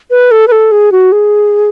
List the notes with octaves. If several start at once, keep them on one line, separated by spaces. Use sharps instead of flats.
B4
A4
B4
A4
G#4
F#4
G#4